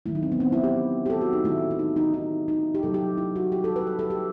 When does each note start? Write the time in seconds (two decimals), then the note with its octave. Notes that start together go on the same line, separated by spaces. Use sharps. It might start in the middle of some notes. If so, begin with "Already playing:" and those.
0.06 D#3 F#3 A3 E4
0.15 D#4
0.23 C4
0.32 B3
0.40 C4
0.52 E4
0.64 G4
1.06 G4
1.10 A4
1.21 F#4
1.33 D#4
1.44 D#3 A3 E4
1.71 E4
1.79 D#4
1.96 D#4
2.14 D#4
2.48 D#4
2.74 G4
2.83 C3 F#3 A3 A4
2.94 G4
3.18 E4
3.36 F#4
3.52 G4
3.64 A4
3.76 B4
3.87 A4
3.99 A4
4.10 G4